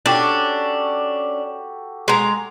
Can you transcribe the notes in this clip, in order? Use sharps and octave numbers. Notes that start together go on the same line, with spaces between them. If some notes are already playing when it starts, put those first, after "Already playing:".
C#4 D4 F#4 G4 A4
G#3 A#5